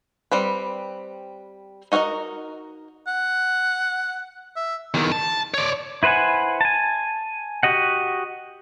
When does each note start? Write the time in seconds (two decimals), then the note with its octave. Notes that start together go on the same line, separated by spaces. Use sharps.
0.31 G3 C4 B4
1.92 D#4 F#4 A#4 C5 D#5
3.07 F#5
4.56 E5
4.94 E2 D#3
5.12 A5
5.54 C#5 D5
6.03 E4 B4 C5 F#5 G#5
6.61 G#5 A5
7.63 F#4 G4 D#5 F#5